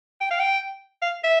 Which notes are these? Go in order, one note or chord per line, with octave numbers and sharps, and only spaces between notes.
G5
F5
G5
F5
E5